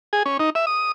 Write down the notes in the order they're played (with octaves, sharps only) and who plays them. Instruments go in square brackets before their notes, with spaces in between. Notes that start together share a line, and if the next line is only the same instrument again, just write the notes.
[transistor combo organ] G#4
C#4
D#4
E5
D#6